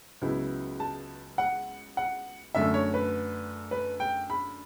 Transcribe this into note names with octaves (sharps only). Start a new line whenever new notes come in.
C#2 C#3 F#3 B3 E4
A5
F#5
F#5
F#2 D3 A3 E5
C#5
B4
B4
G5
B5